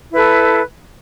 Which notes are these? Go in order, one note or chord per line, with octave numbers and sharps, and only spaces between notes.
E4 A4 B4